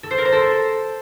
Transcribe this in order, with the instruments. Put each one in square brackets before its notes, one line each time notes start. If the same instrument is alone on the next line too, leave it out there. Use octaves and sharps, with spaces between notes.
[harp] A4
C5
A#4
C5
A4